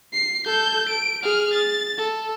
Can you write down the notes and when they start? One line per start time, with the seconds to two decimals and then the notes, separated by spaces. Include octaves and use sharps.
0.13 C7
0.46 A4 G6
0.89 D7
1.23 G#4 F6
1.53 A6
1.98 A4